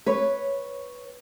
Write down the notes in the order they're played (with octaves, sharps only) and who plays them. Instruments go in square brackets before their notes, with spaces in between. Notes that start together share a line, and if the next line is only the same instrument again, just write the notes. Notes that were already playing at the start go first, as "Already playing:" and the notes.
[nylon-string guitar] B4 C#5